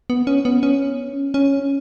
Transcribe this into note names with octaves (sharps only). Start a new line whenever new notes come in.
B3
C#4
B3
C#4
C#4